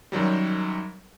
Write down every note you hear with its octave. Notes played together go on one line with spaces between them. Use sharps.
F#2 D#3 F#3 G3